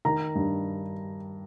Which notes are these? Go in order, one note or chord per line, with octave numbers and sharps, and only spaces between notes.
D#3 A#5
G2